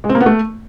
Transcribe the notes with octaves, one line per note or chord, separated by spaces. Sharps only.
G#3
C4
A#3
B3
A3